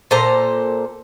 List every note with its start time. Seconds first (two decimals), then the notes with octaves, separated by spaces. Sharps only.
0.11 A#2 A4 C5 A#5